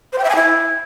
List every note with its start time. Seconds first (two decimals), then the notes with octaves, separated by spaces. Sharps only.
0.13 C5
0.18 G5
0.24 E5
0.30 G#5
0.35 E4